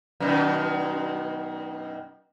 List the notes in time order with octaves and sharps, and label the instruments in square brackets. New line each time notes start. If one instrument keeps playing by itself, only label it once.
[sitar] F#2 B2 D#3